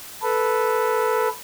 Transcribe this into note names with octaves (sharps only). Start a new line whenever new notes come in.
A4 B4